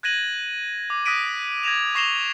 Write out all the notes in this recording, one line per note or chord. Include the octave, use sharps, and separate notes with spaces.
F#6 G#6 A#6 D#7 F#7
D6
D#6 F#6 A#6 B6 D7 D#7
G#6 A#6 E7 F7
C#6 A#6 C7 E7 F7 G7